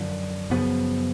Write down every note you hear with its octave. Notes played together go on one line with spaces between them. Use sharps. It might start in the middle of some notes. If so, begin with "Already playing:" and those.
Already playing: F#2 D3 F3
F#2 C#3 F3 B3